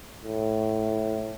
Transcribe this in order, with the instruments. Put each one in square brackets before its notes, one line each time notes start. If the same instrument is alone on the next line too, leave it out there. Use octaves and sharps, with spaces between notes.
[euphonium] A2